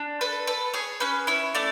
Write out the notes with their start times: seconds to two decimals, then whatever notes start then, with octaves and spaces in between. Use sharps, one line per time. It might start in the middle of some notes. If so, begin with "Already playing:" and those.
Already playing: D4
0.21 A4 B4
0.47 A4 B4
0.74 G#4 C#5
1.00 C#4 B4
1.27 E4 C#5
1.55 A3 D5